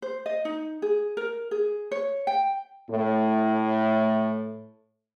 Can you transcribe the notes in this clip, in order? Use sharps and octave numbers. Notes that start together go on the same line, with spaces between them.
C5
D#5
D#4
G#4
A#4
G#4
C#5
G5
A2 A3